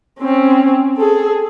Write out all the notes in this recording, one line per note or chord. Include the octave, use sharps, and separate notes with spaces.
C4 C#4
G#4 A4